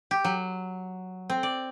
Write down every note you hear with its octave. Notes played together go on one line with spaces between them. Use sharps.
G4
F#3
C4
D5